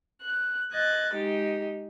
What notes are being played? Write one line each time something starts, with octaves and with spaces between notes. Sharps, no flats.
F#6
D#5 F#6 G#6 A6
G#3 D#4 G4